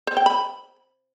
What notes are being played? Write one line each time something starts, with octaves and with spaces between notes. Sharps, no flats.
C5
G5
B5